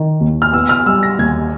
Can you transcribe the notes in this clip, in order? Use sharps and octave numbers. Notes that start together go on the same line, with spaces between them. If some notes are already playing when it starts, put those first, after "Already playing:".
Already playing: D#3
D#2
F6
B3 E6
F6
G3 E6
A#6
D#2 G#6